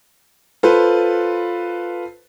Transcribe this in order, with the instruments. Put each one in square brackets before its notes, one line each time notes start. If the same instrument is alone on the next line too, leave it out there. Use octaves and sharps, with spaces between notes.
[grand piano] F4 A4 B4 C5